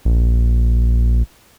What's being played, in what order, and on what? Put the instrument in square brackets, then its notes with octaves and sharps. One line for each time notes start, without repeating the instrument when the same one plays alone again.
[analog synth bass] A#1